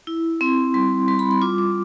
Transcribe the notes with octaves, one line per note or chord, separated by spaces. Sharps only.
E4
C4 C6
G3 C6
G3 C6
B5
C6
F4 D6
D6